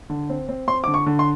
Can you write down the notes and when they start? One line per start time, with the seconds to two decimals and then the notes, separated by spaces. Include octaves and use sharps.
0.10 D3
0.30 C4
0.49 C4
0.68 C4 C6
0.84 D3 D6
0.94 C#6
1.06 D3
1.19 C6